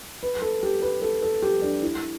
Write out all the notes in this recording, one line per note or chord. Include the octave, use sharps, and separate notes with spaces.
B4
A4
G4
B4
A4
A4
G4
D4
E4